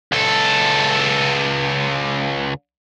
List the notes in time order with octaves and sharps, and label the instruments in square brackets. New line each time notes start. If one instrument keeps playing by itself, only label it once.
[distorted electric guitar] C#2 A4